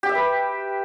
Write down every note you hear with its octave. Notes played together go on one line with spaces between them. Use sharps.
G4
E5
B4